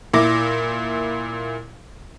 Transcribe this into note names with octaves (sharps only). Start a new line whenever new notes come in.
A#2 E4 D6 A#6